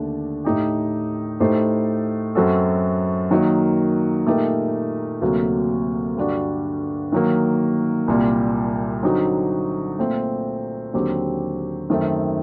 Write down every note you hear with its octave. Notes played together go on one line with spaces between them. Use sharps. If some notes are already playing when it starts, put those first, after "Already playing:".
Already playing: D#2 D3 A3 D4
A2 A3 D#4 G4
A2 A3 D#4 G4 C5
F#2 F#3 C4 F#4 A4
D#3 F#3 A#3 D#4
A#2 A3 D#4 G4 A#4
D2 C3 F#3 A#3 F#4
G2 D3 G3 D4 F#4
D#3 F#3 A#3
C2 A#2 G3
D3 F#3 C4 D#4 F#4
A#2 A3 C4
D#2 D3 F#3 C4 G4
F#2 D#3 A3 C4